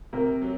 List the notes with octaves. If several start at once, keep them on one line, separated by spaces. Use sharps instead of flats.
C3 A#4
F#3